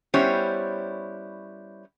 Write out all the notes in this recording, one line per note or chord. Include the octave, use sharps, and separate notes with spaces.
G3 B3 C#4 E4 C5 C#5